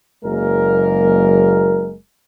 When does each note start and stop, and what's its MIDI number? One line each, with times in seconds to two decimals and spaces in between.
0.25 1.94 30
0.25 1.94 54
0.25 1.94 56
0.25 1.94 58
0.25 1.94 70